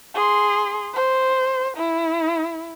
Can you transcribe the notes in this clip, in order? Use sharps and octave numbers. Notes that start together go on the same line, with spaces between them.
G#4 C6
C5
E4